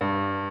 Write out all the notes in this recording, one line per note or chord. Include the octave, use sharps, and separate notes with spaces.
G2